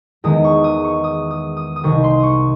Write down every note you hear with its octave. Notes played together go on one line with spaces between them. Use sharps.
E2 D#3 G#3 D#6
C#6
D#6
C#6
D#6
D#6
D#6
D#6
C2 C3 D#3 C#6
C6
C#6 D#6